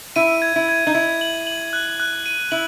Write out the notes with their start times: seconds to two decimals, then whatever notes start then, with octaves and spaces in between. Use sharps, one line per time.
0.16 E4 D#7
0.42 G#6
0.56 E4
0.69 G#6
0.87 D#4
0.94 E4 G#6
1.21 F#7
1.47 F#7
1.73 F#6
2.00 F#6
2.26 D#7
2.51 E4 F#7